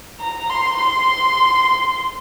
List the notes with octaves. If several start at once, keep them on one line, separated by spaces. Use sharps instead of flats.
A#5
C6
C6